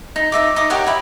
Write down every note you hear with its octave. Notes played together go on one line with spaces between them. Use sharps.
D#4
D#4 D#5 E5 D6
D#4 D6 D#6
G4 A#4 C#5 F#5
E4 B5